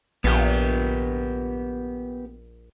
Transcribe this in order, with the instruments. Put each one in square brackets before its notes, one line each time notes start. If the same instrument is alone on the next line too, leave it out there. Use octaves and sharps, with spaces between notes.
[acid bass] A#1 [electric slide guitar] B3 G4